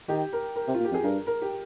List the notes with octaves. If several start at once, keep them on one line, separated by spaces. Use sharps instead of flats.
D#3 G4
A#4
A#4
C3
F4
A#2
G4
F2 G#4
G2 A#4
A#4
G4